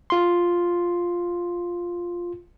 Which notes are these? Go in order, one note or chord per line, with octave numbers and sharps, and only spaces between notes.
F4 C6